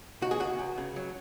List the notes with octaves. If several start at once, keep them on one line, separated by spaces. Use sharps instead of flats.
C#2 F#4
G#4
C#2 F#4
C#2
C#3
F#3